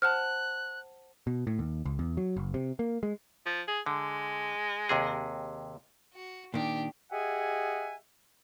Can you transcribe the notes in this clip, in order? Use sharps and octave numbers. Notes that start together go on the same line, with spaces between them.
C5 F#5 A5 F6 F#6
B2
A2
D#2
C#2
E2
F#3
F#1
C3
A#3
G#3
F3
G#4
D3 G#3
D#2 C3 G#4
F#4
A#2 D#3 D4 G4
G4 G#4 D#5 E5 F#5 G#5